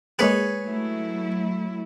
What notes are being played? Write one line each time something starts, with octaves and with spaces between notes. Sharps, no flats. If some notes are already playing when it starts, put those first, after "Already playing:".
G#3 A#3 G#4 B4 C#5 C#7
F#3 A3 E4